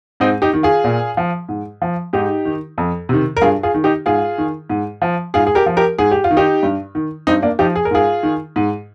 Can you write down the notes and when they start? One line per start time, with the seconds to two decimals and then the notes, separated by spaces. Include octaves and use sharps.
0.20 G#2 C4 D#4
0.42 D#4 G4
0.53 D#3
0.63 F4 G#4
0.84 A#2
1.17 F3
1.49 G#2
1.82 F3
2.13 G#2 D#4 G4
2.45 D#3
2.78 F2
3.09 C3 D#3
3.37 A#4
3.41 G2 F4 G#4
3.63 F4 G#4
3.74 D#3
3.84 D#4 G4
4.06 G#2 F4 G#4
4.38 D#3
4.70 G#2
5.02 F3
5.34 G#2 F4 G#4
5.47 G#4
5.55 G4 A#4
5.66 F3
5.77 G4 A#4
5.98 G#2 G#4
6.11 G4
6.24 F4
6.31 D#3
6.37 D#4 G4
6.63 G2
6.95 D#3
7.27 G2 C4 D#4
7.42 A#3 D4
7.59 F3 D#4 G4
7.76 G#4
7.85 A#4
7.91 G#2 F4 G#4
8.23 D#3
8.56 G#2